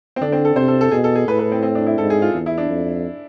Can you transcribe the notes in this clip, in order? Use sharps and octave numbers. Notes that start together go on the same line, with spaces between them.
C4
D3 D4
C4
A4
C3 C5
A4
A4
B2 G#4
A4
G#4
A2 B4
B4
C4
C4
D4
E4
G#2 A4
G#4
F4
E2
E4
D4
F2